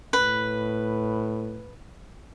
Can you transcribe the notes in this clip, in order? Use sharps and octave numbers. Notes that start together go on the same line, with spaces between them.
A2 B4